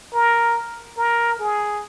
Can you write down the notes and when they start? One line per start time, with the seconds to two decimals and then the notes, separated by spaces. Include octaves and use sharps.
0.14 A#4
0.97 A#4
1.40 G#4